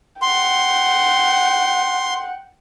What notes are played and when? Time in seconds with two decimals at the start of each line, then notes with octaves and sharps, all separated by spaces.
0.22 F#5 G5 C6